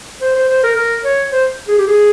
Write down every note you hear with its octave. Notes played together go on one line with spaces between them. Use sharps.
C5
C5
C5
A#4
A#4
C#5
C5
G#4
G4
G#4